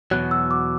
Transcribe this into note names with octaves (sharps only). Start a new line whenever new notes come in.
E2 B2 F#3 F#6
E6
D6